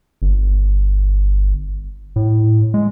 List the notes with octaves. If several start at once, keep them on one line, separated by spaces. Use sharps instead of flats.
G1
A2
G#3